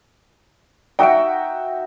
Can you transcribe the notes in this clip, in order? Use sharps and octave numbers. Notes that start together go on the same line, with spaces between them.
D#4 F#4 D5 E5 F#5 G5 D7